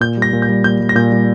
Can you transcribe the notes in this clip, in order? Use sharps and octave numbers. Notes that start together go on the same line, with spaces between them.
A#2 G6
G3
A#6
A#2
G6
G3
A#2 G6
G3
A#6
A#2 G6
G3